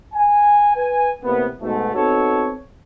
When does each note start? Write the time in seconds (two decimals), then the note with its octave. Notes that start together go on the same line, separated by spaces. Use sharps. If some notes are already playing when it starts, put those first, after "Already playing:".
0.14 G#5
0.76 B4 G#5
1.24 A2 C3 A#3 B3
1.61 G#2 B2 A3
1.95 B3 C4 D#4 F#4 A4 C#5